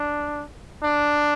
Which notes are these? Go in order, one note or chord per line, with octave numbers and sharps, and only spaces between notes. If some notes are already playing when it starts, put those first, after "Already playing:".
Already playing: D4
D4